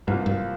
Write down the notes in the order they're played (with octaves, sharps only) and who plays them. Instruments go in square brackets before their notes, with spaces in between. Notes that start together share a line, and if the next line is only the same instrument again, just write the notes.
[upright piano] C2 A#2 F3 A#3 F4 [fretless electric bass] G2
[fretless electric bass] G2